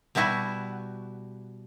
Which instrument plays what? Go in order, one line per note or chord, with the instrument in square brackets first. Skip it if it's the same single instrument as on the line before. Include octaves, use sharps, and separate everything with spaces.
[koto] B2 G3 B3 E4 F#4